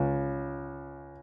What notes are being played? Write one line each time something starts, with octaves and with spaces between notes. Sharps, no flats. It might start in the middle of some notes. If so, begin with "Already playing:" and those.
Already playing: C#2